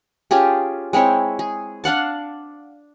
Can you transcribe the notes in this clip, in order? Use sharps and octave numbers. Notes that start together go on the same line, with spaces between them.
C#4 F4 G4 G#4
G#3 C4 E4 C#5
G#4
D4 F5 F#5 A5